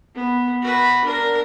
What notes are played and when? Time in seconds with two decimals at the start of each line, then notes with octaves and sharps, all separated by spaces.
0.15 B3
0.62 F#4 B4
1.04 D4 A#4